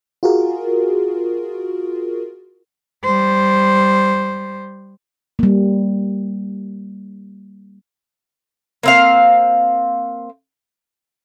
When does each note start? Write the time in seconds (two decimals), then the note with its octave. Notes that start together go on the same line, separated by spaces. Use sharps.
0.23 F4 F#4 G#4 A#4
3.05 G3 C5
5.39 G3 A#3
8.83 A#3 C4 F5